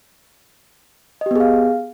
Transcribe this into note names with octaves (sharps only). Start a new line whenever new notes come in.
B3 G4 G#4 D#5 F5